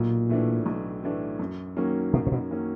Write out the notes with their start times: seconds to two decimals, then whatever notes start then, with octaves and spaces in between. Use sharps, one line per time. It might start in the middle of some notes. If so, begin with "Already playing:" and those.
Already playing: B1 A#2
0.29 A2 E3 A3 D4
0.66 B1
1.03 A2 E3 A3 D4
1.39 F#2
1.76 D#3 F#3 A#3 C#4
2.13 F#2 B2
2.27 A#2
2.32 B2
2.51 D#3 F#3 A#3 C#4